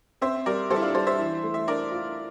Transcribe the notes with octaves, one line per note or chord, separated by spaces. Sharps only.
C4 C5 E5
G3 A#4 D5
G3 A4 C5
E4
D4 F4
G3 A4 C5
C5 E5
E3
A3
E5
D4 A#4 D5
F4